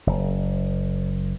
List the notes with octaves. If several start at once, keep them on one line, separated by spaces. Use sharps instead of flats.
F#1